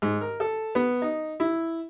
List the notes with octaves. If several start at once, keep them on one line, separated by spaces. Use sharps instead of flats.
G#2
A#4
A4
B3
D#4
E4